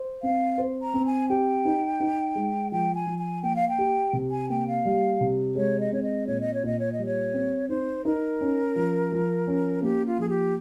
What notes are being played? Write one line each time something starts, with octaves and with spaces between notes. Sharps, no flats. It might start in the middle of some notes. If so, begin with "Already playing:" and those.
Already playing: C5
C4 F5
C5
A#5
C4
G#5
G4 G5
D#4
D#4
G#3
F3 G5
G#5
F3
G#5
A#3 G5
F5
G5
G4
C3
G#5
A#3 G5
F5
G3
C3
G#3 C#5
D#5
C4 C#5
D#5
A#2 C#5
D#5
C#5
A#2 D#5
C#5
D#5
G3
C#5
C4
D#4 C5
D#4 A#4
C#4
F3
F3
C#4
A#3 G4
F4
F3 G#4
G4